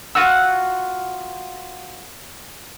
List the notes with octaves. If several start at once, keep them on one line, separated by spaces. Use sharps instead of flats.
F4 F#4 F#5 E6